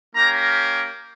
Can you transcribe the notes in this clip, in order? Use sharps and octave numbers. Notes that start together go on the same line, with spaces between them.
A#3 C#4 G4 A#5